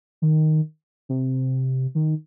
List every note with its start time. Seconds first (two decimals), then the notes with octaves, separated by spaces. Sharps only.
0.22 D#3
1.09 C3
1.95 D#3